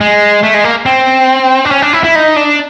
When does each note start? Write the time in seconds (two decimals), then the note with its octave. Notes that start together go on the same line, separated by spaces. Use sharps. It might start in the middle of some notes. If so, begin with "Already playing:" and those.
0.01 G#3
0.43 A3
0.54 G#3
0.64 A#3
0.86 C4
1.65 D4
1.71 C#4
1.82 D4
1.93 E4
2.04 E4
2.15 D#4
2.36 D4